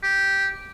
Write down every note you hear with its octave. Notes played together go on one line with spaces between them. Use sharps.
G4